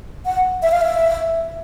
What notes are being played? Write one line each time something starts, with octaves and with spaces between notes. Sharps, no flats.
F#5
E5
F5
E5